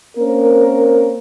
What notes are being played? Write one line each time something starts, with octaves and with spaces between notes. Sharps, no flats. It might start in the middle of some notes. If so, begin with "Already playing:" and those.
A#3 C4 C#4 A#4